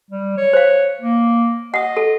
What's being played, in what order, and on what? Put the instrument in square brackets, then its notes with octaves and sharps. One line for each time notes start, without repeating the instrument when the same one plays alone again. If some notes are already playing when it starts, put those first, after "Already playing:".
[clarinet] G3
C#5
[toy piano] C5 F5
[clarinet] A#3
[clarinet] D#5 [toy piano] F#5 D#6
[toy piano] A4